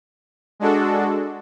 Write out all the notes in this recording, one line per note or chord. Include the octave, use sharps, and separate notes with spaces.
G#3 D4 F#4 A4